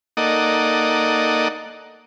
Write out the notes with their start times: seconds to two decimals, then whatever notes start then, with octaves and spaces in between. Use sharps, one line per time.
0.17 A#3 D#4 A4 D5 D#5 F#5